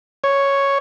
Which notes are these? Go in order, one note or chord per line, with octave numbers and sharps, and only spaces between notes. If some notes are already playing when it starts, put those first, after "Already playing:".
C#5